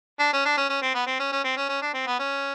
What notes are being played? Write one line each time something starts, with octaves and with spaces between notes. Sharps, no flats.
D4
C#4
D4
C#4
C#4
C4
B3
C4
C#4
C#4
C4
C#4
C#4
D4
C4
B3
C#4